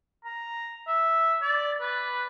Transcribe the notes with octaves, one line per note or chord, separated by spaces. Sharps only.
A#5
E5
D5
B4